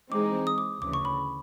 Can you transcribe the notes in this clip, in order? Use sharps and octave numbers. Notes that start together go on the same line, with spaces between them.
E3 G#3 C4 D#4 D6
D#6
D6
D2 C#3 E3 D6
C#6
B5